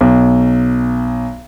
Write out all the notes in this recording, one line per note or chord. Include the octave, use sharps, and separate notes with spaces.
B1